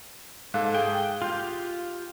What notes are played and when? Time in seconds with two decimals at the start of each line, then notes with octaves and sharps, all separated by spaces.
0.54 G#2 A4 F5 F#6
0.75 G#4 G5
1.22 F4 G4 C6 G6